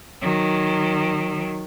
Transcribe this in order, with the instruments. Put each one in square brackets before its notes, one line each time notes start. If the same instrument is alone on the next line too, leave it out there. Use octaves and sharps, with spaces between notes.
[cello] D#3 F#3